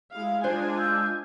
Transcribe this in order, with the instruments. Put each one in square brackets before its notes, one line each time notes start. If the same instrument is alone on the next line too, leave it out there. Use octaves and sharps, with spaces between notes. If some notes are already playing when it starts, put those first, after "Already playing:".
[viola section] G#3 E4 F5
[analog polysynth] G#3 D4 [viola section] F4 G#5 [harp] C5
[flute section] E6 G6